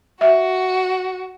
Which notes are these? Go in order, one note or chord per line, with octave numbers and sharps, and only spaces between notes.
F#4 E5